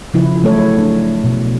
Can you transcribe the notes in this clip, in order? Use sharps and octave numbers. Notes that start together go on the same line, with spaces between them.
C#3 F3 E4
F#3 A3 E4 A4 C#5
D4
B2